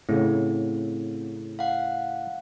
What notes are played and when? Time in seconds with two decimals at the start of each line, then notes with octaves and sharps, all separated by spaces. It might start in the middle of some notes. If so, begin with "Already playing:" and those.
0.09 A2 C#3 C4
1.59 F5 F#5